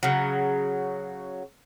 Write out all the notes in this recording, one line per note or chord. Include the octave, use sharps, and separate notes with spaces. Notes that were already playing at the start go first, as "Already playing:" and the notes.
C#3 F#3